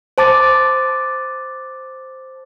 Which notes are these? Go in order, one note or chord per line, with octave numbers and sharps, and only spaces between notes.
C5 A5 D6 A6